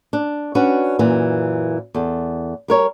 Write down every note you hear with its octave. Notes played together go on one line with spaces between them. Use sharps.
D4
C#4 D4 F#4 B4
F#2 A#2 E3
E2 A4
G3 A#4 C#5